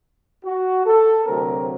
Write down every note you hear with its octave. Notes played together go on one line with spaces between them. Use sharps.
F#4
A4
D2 C3 F#3 C4 A#4